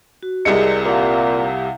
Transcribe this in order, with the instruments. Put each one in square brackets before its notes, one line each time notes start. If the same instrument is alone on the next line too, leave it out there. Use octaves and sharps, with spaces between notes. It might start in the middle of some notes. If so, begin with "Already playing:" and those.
[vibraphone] F#4
[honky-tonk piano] C2 C3 C#7 [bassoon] G#3 [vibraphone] G#4 A#4 D5
[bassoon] A#2 [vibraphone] F5 F#5